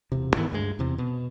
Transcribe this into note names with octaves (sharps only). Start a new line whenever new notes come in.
E1 C3
G#2 D#3 E3 B3
D2 G2 G#3
E2 C3
B2